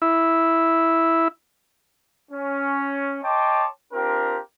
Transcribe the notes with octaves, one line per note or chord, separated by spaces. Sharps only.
E4
C#4
C#5 D#5 G5 A5 C6 D6
C4 D4 F4 G4 A#4